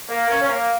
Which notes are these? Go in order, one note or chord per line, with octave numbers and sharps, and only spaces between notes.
A#3
A#3 C#4
C#4
A#3